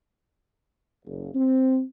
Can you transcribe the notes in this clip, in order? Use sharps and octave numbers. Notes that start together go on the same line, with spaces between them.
F#1
C4